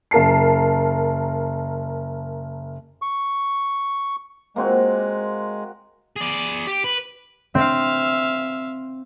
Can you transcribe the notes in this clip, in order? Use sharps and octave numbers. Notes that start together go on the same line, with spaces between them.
F#1 A#4 A5 C7
C#6
G#3 A#3 C4 F#4
G#4 D5
G4
B4
C4 E5 F5